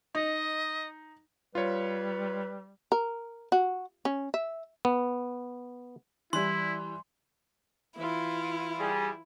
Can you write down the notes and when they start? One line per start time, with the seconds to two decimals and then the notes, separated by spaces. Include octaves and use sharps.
0.15 D#4 D#5
1.55 G3 F4 B4 C#5
2.92 A#4
3.52 F#4
4.05 C#4
4.34 E5
4.85 B3
6.33 E3 G3 E4 C6
7.97 E3 E4 F4
8.79 G3 G#4